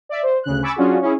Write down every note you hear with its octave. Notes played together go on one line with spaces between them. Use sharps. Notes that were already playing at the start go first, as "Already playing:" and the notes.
D5 E5
C5
D2 C#3 F#6
G#5 B5 C#6 D6 E6 A6
F#3 C#4 D4 F4 F#4 G#4
C#4 E4 G#4